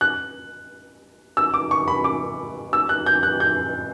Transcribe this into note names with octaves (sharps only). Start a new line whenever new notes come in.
F#6
E6
D6
C#6
B5
D6
E6
F#6
G6
F#6
G6